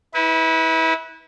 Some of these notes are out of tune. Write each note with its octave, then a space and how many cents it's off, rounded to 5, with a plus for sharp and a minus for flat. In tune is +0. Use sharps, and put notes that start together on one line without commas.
E4 -30 B4 +0